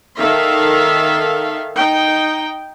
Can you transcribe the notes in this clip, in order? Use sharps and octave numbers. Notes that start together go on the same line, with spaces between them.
D#3 A4 E5 F5
D#4 G5